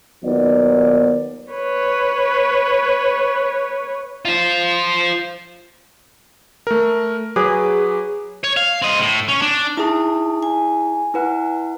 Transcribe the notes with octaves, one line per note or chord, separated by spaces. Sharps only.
D#2 F#3 B3 D#4 F4 D5
B4 C#5
F4 C5
A3 A#4
F#3 G#4 B4 D6
C#5
F5
C4 D#5
A2
C#4
D4
D#4 E4 G#4 A5
G#5
E4 B4 F#5